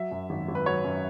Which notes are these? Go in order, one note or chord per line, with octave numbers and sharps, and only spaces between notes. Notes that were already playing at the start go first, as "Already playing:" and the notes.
Already playing: F#3 E5
F#2
G#1
G#1
B4
F#3 C#5
F#2